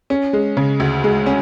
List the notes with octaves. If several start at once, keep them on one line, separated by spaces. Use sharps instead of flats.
C#4
G#3
C#3
D2
G#3
C#4